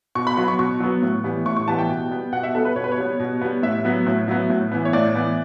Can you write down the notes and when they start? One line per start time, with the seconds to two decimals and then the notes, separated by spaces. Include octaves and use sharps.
0.15 B2 C#6
0.27 B5
0.37 F#3 B3 B5
0.48 C#6
0.59 B2 C#6
0.80 F#3 B3
1.03 A2
1.24 E3 G3 B3
1.46 A2 C#6
1.56 C#6
1.68 E3 G3 B3 A5
1.79 G5
1.89 B2
2.11 G3 B3
2.32 B2 F#5
2.43 E5
2.54 G3 B3 A4
2.65 B4
2.76 B2 C#5
2.84 B4
2.91 C#5
2.98 G3 B3
3.20 B2
3.41 G3 B3
3.63 A2 E5
3.85 F#3 B3
4.07 A2
4.28 F#3 B3
4.50 A2
4.72 E3 B3
4.85 C#5
4.93 A2 D5
5.15 E3 B3